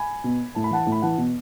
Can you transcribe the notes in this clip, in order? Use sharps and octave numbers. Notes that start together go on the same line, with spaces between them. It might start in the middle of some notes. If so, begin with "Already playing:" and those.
Already playing: G#5 B5
B2
A2 A5
B5
E3 F#5 A5
A2
B5
E3 F#5 A5
B2